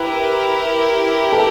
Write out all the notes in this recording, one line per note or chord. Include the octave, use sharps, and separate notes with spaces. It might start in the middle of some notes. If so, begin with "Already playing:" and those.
Already playing: E4 G4 A#4 B4
A4 B4